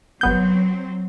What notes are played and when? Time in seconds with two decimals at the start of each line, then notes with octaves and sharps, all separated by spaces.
0.21 G1 F#3 B3 C4 G6